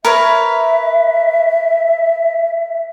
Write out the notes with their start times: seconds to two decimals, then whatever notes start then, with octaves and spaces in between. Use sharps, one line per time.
0.05 A#4 B4 C#5 E5